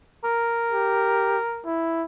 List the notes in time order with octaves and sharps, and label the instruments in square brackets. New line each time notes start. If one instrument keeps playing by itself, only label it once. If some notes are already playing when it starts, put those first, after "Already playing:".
[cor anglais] A#4
[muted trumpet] G4
E4